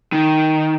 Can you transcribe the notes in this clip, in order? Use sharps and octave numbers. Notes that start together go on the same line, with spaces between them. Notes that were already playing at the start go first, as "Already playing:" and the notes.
D#3